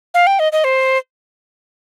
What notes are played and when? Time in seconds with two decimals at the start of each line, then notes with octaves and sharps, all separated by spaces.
0.14 F5
0.27 G5
0.39 D#5
0.52 D#5
0.64 C5